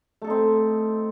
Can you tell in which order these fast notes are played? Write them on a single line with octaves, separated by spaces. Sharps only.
A3 A4 D#4 C4